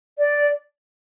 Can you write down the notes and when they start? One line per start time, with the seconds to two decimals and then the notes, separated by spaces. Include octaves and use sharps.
0.18 D5